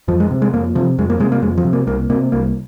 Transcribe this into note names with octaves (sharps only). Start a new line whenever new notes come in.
F2 F3
G#3
C3
G#3
F2 A#3
C3 F3
F2 G#3
A#3
C3 G#3
A#3
F2 G#3
F3
C3
A#3
C2 A#3
C3 A#3
C2 A#3